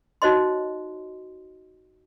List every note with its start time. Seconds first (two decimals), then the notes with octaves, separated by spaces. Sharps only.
0.22 D#4 F#4 C5 C#5 D#5 C6